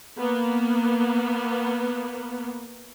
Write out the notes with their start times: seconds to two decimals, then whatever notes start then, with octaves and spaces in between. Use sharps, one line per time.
0.18 A#3 B3